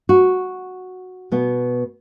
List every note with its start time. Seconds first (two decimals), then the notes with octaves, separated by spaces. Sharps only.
0.09 F#4
1.32 B2 B3